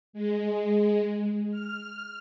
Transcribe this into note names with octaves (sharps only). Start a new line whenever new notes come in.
G#3
F6